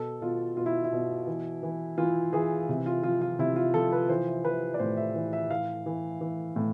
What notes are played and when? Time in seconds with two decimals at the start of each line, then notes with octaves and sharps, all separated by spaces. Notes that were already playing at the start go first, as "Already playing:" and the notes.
Already playing: B2 A4
0.22 B2 F4
0.57 B2 F4
0.66 E4
0.84 E4
0.93 B2
1.27 E3
1.63 E3
1.98 E3 F4
2.33 E3 G#4
2.69 C3
2.86 F4
3.03 F3 F4
3.21 F4
3.39 C3 E4
3.56 F4
3.74 F3 A4
3.92 B4
4.09 E3 C5
4.44 E3 B4
4.74 D5
4.79 A2 C5
4.97 E5
5.15 E3
5.33 E5
5.50 E3 F5
5.86 E3
6.21 E3
6.56 A2